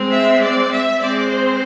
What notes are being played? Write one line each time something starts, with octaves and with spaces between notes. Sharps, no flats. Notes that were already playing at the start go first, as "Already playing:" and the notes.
Already playing: G#3 C4
E5
D5
E5
G#3 C4 D5
C5